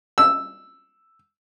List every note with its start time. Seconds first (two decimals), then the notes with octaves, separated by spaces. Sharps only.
0.18 E6